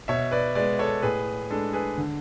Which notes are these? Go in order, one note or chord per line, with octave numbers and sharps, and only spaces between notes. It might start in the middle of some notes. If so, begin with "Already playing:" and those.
B2 C#5 E5
B4 D5
G#3 B3 B4 D5
A4 C#5
A2 G#4 B4
G#3 D4 A4
G#4 B4
D3